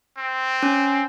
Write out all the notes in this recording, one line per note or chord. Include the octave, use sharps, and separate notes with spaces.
C4
C#4